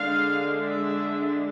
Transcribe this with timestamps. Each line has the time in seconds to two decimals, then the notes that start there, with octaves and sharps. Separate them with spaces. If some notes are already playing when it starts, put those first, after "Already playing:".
Already playing: D3 G#3 D4 F5
0.61 E5